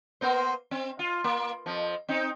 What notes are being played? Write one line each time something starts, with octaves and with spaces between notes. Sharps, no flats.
A#3 B3 C5
C4
F4
A#3
F2 F3
C4 D#4